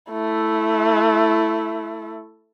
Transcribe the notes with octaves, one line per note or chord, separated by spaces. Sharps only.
A3 E4